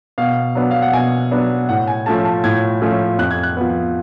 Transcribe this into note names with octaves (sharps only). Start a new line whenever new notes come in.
B2 F5
F#3 B3 D4
F5
F#5
B2 G#5
F#3 B3 D4
A2 F#5
G#5
F3 A3 C#4 A5
A5
A2 G#6
F3 A3 C#4
F2 F#6
G#6
F#6
F3 B3